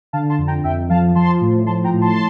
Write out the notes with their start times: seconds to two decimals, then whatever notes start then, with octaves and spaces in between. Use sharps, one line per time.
0.13 D3 F5 A5
0.29 A5 C6
0.38 F2
0.47 G5 A#5
0.64 F2 E5 G5
0.90 F3 F5 A5
1.15 F3 A5 C6
1.41 A2
1.66 F3 A5 C6
1.84 G5 A#5
1.93 A2
2.01 A5 C6